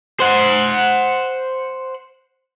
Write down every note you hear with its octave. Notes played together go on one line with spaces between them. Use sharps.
C5 F#5